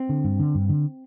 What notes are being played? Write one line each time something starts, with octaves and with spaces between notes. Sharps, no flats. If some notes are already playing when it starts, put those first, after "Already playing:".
Already playing: C4
D3
G2
D3
G2
D3